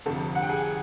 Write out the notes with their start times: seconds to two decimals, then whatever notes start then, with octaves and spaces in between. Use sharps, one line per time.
0.06 G1 F2 C3 A4 A5
0.35 F#5
0.42 G5
0.49 G#4 G#5